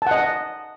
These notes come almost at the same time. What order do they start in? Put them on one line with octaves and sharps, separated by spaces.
A5 F#5 D#5